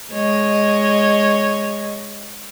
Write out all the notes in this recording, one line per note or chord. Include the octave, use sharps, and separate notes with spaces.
G#3 C#5 D#5